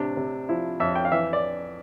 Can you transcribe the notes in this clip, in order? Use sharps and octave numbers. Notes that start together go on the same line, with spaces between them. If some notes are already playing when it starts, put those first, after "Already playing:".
Already playing: A2 C3 D4
C3
F3 E4
F2 E5
G5
F5
E3 E5
D5